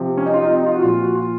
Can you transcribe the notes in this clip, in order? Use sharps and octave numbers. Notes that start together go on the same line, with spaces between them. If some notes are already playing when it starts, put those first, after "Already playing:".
Already playing: C3 F3
C#4
D#4
F4
D#4
C4
D#4
F4
F#4
A#2 F3 F4
F#4
F4